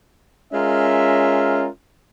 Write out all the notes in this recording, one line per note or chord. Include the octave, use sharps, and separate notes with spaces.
G#3 C#4 F4 A#4 E5